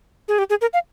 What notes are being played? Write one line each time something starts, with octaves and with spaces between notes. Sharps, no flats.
G#4
G4
G#4
A#4
F5